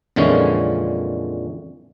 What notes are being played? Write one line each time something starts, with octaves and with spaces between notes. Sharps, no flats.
F2 A#2 D3 E3 G#3 C#4